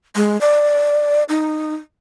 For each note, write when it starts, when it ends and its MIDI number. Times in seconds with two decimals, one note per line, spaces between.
0.15 0.39 56
0.41 1.23 74
1.29 1.74 63